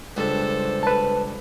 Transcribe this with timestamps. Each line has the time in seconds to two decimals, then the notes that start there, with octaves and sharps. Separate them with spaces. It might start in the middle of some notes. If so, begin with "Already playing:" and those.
0.17 C#2 G2 A4 C5
0.83 B4 A5